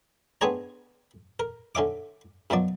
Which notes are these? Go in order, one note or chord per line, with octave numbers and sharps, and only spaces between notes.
B3 C4 D4 G#4 C#5 A#5
A#4
D3 C#4 E5 D6
F#2 B2 F3 F#3 D5